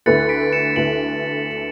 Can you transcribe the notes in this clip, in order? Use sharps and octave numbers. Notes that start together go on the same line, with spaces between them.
D2 D3 A3 E4 B4 A6 C#7
B6 D7
C#7 E7
D2 D3 A3 E4 B4 D7 F#7